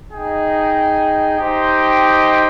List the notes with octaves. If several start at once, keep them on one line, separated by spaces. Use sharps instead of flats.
D#4 G#4 D#5 G5
D#4 G4 C5 D#5 G5